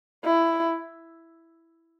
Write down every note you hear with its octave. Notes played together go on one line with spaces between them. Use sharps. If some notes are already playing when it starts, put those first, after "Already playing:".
E4